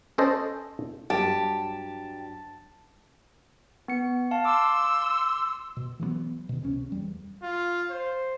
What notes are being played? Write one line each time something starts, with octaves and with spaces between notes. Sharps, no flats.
C#4 A4 C5 D#5
G2 F#3 G4 A5
B3 C#7
F5 A5
C6 D6 E6
B2
E3 F#3 G#3 B3
B2 D#3
C#2 C3 C#4
E2 G3
F4
C5